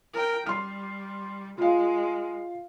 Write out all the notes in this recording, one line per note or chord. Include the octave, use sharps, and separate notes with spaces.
A#4 G5
G3 C6 F6
G#3 F4 F5